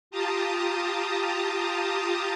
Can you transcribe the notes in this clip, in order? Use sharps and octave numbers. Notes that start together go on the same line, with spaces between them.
F4 G4 A5 A#5 D#6